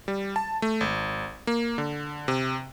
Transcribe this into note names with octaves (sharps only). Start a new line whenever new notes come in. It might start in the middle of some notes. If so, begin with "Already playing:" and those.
G3
A5
A3
G#1
A#3
D3
C3